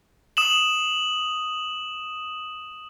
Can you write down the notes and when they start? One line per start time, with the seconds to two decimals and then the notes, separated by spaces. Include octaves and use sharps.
0.37 D#6 E7 F#7